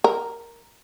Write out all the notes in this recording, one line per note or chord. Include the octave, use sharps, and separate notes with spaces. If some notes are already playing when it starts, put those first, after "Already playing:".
A#4